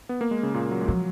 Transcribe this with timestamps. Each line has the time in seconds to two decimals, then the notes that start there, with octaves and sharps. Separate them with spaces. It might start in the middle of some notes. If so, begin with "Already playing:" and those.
0.09 B3
0.21 A#3
0.31 G#3
0.43 C#3
0.54 A#2
0.71 F#3
0.81 G#3
0.88 F3 F#3